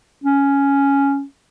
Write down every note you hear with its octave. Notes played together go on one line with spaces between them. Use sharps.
C#4